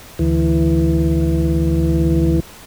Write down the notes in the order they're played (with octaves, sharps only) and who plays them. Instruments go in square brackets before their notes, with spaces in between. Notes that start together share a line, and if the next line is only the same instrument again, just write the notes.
[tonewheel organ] D2 E3